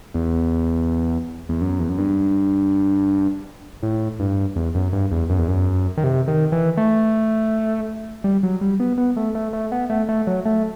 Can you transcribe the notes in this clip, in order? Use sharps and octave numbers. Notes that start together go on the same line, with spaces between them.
E2
E2
F#2
E2
F#2
G2
A2
G2
E2
F#2
G2
E2
F#2
E2
F#2
D#3
C3
D#3
E3
A3
G3
F#3
G3
B3
B3
A3
A3
A3
B3
A3
A3
F#3
A3